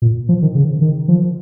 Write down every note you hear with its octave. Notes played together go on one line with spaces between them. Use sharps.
A#2
F3
D#3
C#3
D#3
F3